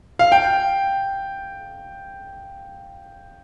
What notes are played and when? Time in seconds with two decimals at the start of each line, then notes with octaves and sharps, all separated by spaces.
0.19 F5
0.32 G5